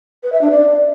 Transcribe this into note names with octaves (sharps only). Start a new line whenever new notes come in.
B4
E5
D4
D5